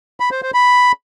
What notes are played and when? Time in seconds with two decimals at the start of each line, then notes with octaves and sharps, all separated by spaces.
0.20 B5
0.31 C5
0.43 C5
0.54 B5